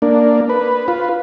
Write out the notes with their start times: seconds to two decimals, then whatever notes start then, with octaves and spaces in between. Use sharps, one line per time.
0.02 A#3 D4
0.49 B4
0.88 F4 B4